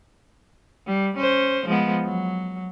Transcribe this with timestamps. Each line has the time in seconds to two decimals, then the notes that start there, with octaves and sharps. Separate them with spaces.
0.87 G3
1.17 C#4 C5
1.66 F3 G#3 B3
2.04 F#3